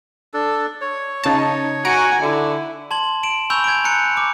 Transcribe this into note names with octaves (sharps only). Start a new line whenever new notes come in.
D4 A4
C#5
C#3 D#4 A5
F#4 F#5 G#5 A#5 C#7 D7
D3 E4
A5 C6 G#6 F#7
D7 E7 F#7
G#5 B5 C#6 E6 G6 F7
G#6 D7
G#5 A#5 F#6 G6 C#7
C#6 D6